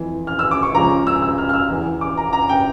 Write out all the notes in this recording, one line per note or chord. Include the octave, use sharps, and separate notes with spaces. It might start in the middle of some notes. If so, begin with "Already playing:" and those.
Already playing: F2 E3
F6
E6
D6
C#6
C#2 C#3 F3 A#5
E6
E6
F6
F6
E6
E2 E3
D6
A#5
A#5
G5